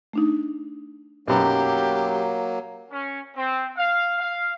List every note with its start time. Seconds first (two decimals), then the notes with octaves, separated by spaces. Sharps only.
0.13 A3 D4 D#4
1.28 B1 F#2 F#3 A#3 G4 B5
2.91 C#4
3.36 C4
3.78 F5
4.20 F5